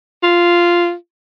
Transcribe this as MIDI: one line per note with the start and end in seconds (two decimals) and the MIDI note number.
0.23 0.94 65